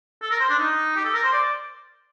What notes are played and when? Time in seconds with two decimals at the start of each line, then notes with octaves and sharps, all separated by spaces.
0.22 A4
0.31 A#4
0.40 C5
0.49 D4
0.59 D#4
0.96 G4
1.04 A4
1.14 A#4
1.23 C5
1.33 D5